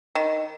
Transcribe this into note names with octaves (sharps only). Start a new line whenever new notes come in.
D#3